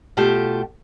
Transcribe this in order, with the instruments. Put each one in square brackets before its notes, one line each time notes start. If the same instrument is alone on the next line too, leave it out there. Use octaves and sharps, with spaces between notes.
[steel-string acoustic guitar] B2 A3 F4 G4 A5